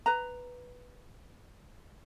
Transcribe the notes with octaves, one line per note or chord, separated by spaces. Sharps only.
B4 A#5